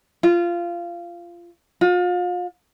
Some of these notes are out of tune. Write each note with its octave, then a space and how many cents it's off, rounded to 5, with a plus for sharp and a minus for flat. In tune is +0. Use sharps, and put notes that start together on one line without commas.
F4 -15
F4 +35